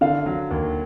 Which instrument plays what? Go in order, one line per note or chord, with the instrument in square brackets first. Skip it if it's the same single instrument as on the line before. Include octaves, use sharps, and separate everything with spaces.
[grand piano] D3 [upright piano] F5
[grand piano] F#3
D#2